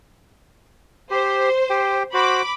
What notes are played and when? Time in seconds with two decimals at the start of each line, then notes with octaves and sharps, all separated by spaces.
1.11 G4 C5
1.70 G4 G5
2.14 F#4 C5 B5 D6